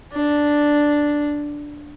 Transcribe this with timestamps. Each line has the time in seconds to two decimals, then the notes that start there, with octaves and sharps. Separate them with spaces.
0.13 D4